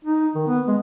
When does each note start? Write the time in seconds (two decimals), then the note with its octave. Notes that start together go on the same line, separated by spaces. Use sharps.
0.05 D#4
0.35 D#3
0.48 B3
0.68 G#3